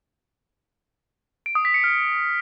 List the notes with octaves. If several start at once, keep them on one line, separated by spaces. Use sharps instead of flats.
D7
D#6
B6
C#7
F6